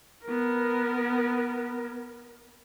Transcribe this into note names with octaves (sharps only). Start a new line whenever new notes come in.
B3 A#4